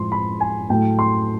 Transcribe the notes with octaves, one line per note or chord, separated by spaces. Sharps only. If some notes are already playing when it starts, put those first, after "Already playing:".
Already playing: A2 F3 G#3 C6
B5
G#5
A2 F#3 A3 G5
C6